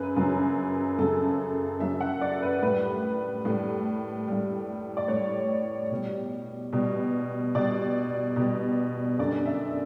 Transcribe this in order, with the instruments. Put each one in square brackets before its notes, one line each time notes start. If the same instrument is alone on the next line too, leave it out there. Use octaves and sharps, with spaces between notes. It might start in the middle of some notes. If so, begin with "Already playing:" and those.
Already playing: [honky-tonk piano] F#2 C#3 B4
F#2 C#3 F#3
F#2 C#3 F#3 A4
F#2 C#3 F#3 E5
F#5
D5
B4
A2 G3 B4
A2 G3
A2 G3
D5
A2 C#5
G3
B2 G3
B2 G3
B2 G3 D5
B2 G3
F#2 D3 G3 D5
E5